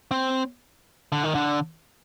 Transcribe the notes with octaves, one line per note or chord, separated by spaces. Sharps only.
C4
D3
D#3
D3